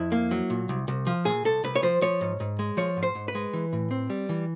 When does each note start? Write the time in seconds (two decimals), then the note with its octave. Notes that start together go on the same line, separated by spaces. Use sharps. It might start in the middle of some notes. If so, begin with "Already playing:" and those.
Already playing: F2 E4
0.12 A#3
0.31 F#3
0.50 A#2
0.69 C2
0.88 C2
1.07 F3
1.25 A#2 G#4
1.44 C2 A4
1.64 C2 B4
1.75 C#5
1.83 F3 C5
2.01 F3 C#5
2.21 G#2
2.40 G#2
2.59 G#3
2.77 F3 C#5
2.97 G#2
3.03 C5
3.15 G#2
3.28 B4
3.35 G#3
3.53 E3
3.73 A2
3.91 C4
4.10 G3
4.29 E3